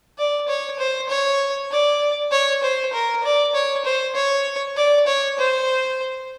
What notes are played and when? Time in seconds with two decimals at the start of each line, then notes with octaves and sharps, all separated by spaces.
0.18 D5
0.48 C#5
0.79 C5
1.09 C#5
1.71 D5
2.31 C#5
2.63 C5
2.93 A#4
3.24 D5
3.55 C#5
3.85 C5
4.15 C#5
4.77 D5
5.07 C#5
5.38 C5